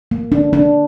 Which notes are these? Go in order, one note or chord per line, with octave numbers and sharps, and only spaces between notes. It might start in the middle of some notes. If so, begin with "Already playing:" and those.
A#3
D4
D4